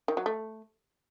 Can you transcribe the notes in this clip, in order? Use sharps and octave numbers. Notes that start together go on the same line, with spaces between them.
D#3
F#3
A3